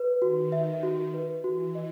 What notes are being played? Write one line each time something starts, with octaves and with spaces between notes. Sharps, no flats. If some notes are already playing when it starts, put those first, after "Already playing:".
Already playing: B4
D#3 F#4
E5
F#4
B4
E3 F#4
D#5